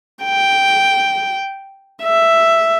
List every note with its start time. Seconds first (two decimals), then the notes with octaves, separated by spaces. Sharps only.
0.24 G5
2.03 E5